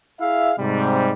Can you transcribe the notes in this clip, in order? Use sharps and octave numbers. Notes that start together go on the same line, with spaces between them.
E4 G#4 E5 F5
G#2 C3 G3